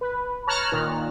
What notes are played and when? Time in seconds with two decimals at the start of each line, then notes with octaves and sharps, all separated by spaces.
0.01 B4
0.47 C#5 A5 A#5 F6 F#6
0.72 A#2 D#3